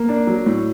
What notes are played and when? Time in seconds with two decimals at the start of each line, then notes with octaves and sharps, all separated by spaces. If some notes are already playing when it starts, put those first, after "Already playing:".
Already playing: A#3
0.09 D4
0.27 F#3
0.46 A2